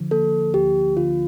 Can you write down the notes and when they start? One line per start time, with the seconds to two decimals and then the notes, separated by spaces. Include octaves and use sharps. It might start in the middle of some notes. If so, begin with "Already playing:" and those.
Already playing: D3 F3
0.11 A#3 A4
0.54 D2 G4
0.97 D3 F4